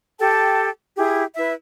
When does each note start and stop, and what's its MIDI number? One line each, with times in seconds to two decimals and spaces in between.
0.19 0.68 67
0.19 0.68 69
0.19 0.68 79
0.19 0.68 81
0.97 1.23 64
0.97 1.23 67
0.97 1.23 68
1.37 1.52 64
1.37 1.52 71
1.37 1.52 76